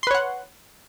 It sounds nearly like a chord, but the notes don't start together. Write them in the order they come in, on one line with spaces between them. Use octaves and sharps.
C6 B4 C#5 F#5